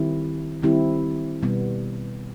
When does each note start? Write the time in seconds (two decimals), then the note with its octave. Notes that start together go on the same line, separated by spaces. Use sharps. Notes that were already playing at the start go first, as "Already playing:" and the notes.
Already playing: D#3 G3 C4 E4 G4
0.63 D#3 G3 C4 E4 G4
1.43 B2 G3 B3